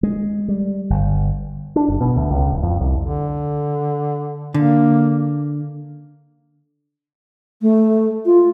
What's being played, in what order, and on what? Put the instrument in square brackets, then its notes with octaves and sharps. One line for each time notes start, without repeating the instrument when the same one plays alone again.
[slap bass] G#3
G3
G1
[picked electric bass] D4
F#1
B2
D2
C#2
D1
F2
C2
[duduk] D3
[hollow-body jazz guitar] D3 [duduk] A#3
[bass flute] A3
F4